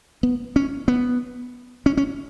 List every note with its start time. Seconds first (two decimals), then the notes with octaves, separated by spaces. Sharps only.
0.23 B3
0.56 C#4
0.88 B3
1.86 C#4
1.97 C#4